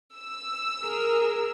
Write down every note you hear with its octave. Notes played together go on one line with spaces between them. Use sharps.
E6
G#4 A#4